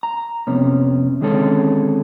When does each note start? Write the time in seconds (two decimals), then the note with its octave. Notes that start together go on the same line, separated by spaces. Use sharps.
0.03 A#5
0.47 F2 C3 B3 C#4
1.21 D3 D#3 G#3 C4 C#4 A4